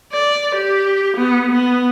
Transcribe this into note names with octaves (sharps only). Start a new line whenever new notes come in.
D5
G4
B3
B3